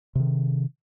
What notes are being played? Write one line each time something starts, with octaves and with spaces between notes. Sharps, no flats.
C3 D#3